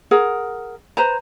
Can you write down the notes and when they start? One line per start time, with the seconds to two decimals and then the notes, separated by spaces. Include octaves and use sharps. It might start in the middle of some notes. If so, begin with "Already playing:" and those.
0.11 G#4 A#4 F#5
0.97 B4 C5 A#5